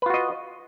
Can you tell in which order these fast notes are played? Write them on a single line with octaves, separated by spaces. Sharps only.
B4 F4 F#4 D#5